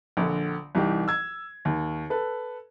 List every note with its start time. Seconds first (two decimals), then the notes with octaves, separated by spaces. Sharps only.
0.17 A#1 D3
0.75 C2 E3 D#4 G4
1.08 E6 G#6
1.65 D#2
2.10 A4 B4